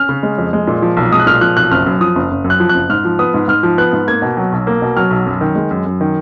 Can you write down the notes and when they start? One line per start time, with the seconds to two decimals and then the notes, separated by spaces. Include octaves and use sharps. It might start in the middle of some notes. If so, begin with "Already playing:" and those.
Already playing: C#4 F6
0.09 C#3
0.23 G#3
0.38 F2
0.53 G#3
0.67 A#2
0.82 F3
0.97 B1
1.12 G#3 D#6
1.20 F#6
1.27 A#2 F6
1.41 F3 F#6
1.56 B1 F#6
1.71 F#1 F6
1.86 F#2
2.01 F3 D#6
2.15 F#1
2.31 F#1
2.44 F#2
2.50 F#6
2.60 F3
2.69 F#6
2.74 F#1
2.90 G#2 F6
3.05 F3
3.19 B3 D#6
3.34 G#2
3.48 G#2 F6
3.63 F3
3.78 B3 F#6
3.93 G#2
4.07 A#3 G#6
4.22 B2
4.37 F#3
4.52 B1
4.67 A#3
4.82 B2
4.97 F#3 F6
5.11 B1
5.26 F#2
5.41 D#3
5.55 G#3
5.71 F#2
5.86 F#2
6.01 D#3